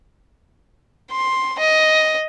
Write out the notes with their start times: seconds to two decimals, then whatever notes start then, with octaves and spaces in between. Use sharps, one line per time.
1.11 C6
1.59 D#5